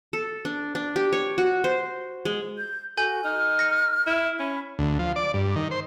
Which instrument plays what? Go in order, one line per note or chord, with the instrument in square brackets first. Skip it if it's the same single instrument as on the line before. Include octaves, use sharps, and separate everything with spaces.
[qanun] A4
D4
D4
G4
C#5
F#4
C5
G#3
[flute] G6
[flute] F#4 [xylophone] A4 G#5 G6
[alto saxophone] D#4 [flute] F6
[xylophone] A#6 C#7
[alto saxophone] E4 [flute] F6
[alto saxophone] C#4 [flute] B5
[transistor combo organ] D2
F3
D5
G2
D#3
C5